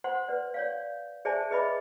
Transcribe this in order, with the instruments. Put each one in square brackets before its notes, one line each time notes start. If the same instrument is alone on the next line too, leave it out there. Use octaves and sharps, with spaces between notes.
[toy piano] C5 F#5 C6
B4 D5
C#5 D5 F5
G#4 C5 D5 E5 G#5 A5
G#4 B4 D#5 E5 B5 D6